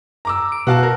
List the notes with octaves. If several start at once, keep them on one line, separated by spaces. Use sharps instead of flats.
A#5 D6 E6
D7
B2 F#4 F5 A5
A#4